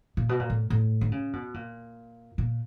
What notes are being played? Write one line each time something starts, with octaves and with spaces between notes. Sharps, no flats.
A#2
B2
A#2
A2
A2
D3
C#3
B2
A#2
A#2